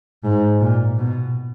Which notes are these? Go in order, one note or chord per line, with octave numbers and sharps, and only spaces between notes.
G#2
A#2
B2